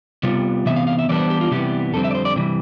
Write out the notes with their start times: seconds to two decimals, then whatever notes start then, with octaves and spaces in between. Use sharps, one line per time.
0.23 C3 G3 B3 F4
0.66 C3 E3 B3 E5
0.76 F5
0.87 F5
0.99 E5
1.09 E3 G3 B3 D4 D5
1.19 C5
1.30 G4
1.41 F4
1.51 C3 E3 G3 B3 G4
1.94 F2 D3 G3 C4 A4
2.04 E5
2.11 D5
2.15 C5
2.25 D5
2.36 C3 E3 G3